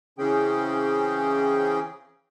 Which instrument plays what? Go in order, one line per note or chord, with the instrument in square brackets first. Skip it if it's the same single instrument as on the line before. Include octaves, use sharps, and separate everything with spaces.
[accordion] C#3 E3 C4 C#4 G#4 G5